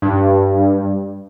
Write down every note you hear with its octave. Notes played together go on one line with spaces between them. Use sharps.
G2